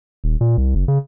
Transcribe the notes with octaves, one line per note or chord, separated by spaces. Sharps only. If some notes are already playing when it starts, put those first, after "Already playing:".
D#1
A#2
C2
F#1
C#3